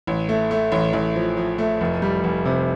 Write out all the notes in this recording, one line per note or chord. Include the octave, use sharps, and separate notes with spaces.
A1
A3
A3
A1
A1
F3
F3
A3
F1
G3
F1
C3